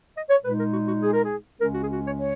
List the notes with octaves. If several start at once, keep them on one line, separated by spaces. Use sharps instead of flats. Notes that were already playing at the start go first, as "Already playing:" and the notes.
D#5
C#5
A#2 G#3 D#4 B4
A#4
F#4
F#4
G#4
A#4
G#4
C#2 C#3 G#3 C#4 A#4
F#4
G#4
F#4
C#5
C#5